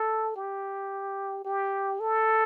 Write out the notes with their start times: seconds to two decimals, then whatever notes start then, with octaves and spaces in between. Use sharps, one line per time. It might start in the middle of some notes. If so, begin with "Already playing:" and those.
Already playing: A4
0.36 G4
1.45 G4
2.00 A4